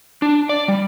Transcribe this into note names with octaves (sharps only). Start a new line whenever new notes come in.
D4
D5
G3